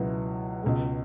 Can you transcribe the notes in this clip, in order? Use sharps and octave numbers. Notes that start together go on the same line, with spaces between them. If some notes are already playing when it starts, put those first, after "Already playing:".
Already playing: C#2 B2 F#3 B3 E4
C#2 B2 G#3